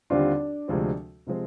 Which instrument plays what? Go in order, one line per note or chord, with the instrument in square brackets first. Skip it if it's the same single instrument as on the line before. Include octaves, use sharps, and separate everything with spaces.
[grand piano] D#2 D3 G3 C4 F4 [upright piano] D4
[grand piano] D2 C3 F3 G#3 C4
C3 F3 G#3 C4